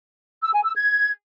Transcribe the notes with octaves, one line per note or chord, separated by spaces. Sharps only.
E6
G#5
E6
G#6